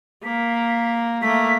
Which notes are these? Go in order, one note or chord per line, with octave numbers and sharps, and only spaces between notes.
A#3 B6
A3 A#3 B6